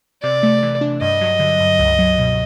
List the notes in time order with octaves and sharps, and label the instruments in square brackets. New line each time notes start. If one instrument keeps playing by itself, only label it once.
[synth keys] C3 [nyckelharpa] D5
[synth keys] A3
E3
D4
[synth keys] G2 [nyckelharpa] D#5
[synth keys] F#3
D3
G2
C#2
F#3
B2